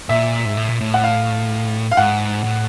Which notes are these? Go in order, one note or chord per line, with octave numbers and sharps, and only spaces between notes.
A#2 E5
G#2
A2
A#2
A2
F#5
F5
F5
G#2 F#5
A2